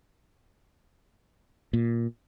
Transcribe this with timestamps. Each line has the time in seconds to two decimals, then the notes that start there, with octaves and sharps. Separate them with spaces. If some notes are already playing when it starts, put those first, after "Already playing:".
1.73 A#2